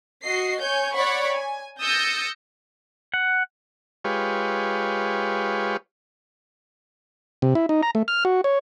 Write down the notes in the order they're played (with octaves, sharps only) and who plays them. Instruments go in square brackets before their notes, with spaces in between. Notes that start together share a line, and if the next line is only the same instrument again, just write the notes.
[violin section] F#4 D#5 C7
C#5 G#5 G6
C#5 D5 F#5 B5 C#6
G#5
D#6 E6 G6 A6 A#6 C#7
[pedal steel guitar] F#5
[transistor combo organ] G#3 F4 G4 B4 C#5
C3
E4
D#4
A#5
A3
F6
F#4
C#5